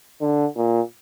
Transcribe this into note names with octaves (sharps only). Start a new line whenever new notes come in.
D3
A#2